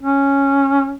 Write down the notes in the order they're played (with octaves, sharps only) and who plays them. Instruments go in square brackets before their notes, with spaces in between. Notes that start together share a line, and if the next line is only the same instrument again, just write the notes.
[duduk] C#4